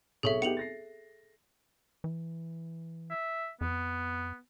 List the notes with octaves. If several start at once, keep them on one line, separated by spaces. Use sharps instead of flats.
B1 G#4 A4 C#5 E5 C#6
B3 D#4 G4 C#7 F7 F#7
A6 A#6 C7
E3
E5
F2 B3